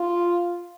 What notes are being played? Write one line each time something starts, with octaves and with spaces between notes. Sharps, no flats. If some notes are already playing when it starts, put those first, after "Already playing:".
Already playing: F4